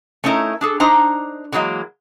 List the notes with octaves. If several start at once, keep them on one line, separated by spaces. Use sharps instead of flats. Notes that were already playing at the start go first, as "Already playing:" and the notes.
A3 C#4 D#4 E4 A#4
D4 G#4 A4
D4 D#4 C5 A#5
D3 E3 F#3 G#3 A#3